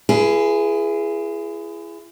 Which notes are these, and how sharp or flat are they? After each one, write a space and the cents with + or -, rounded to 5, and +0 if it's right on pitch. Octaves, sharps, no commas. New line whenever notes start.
E4 +35 G#4 +0 B4 -35